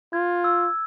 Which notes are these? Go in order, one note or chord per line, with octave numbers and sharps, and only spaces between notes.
F4 G#6
E6